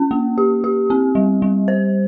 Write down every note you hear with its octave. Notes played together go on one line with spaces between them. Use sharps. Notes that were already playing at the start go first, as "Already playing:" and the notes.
Already playing: C#4
A#3
G4
G4
C4
G3
G3
C5